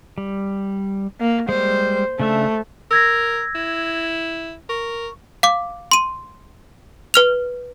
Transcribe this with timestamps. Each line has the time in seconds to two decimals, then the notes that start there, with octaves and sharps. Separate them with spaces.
0.18 G3
1.20 A#3
1.49 G3 G#3 C5
2.19 C#3 A3 D4 E5
2.91 A#4 E6 G#6 A#6
3.55 E4
4.69 A#4 C#6
5.43 F5 D6
5.91 C6 D#7
7.14 B4 F6 F7